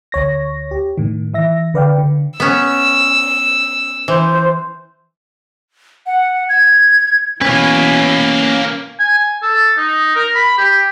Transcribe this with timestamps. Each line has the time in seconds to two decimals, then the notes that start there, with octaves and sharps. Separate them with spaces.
0.12 D2 C#5 A#6
0.71 G4
0.98 A2 D#3
1.34 E3 E5 A#6
1.74 D3 B4 D5 F5 G5
1.98 D3
2.40 B3 C#4 E6
4.08 E3 C5
6.06 F#5
6.49 G#6
7.41 B2 E3 A#3 C#4 B4 C#5
9.00 G#5
9.43 A4
9.77 D#4
10.15 A#4
10.35 B5
10.58 G4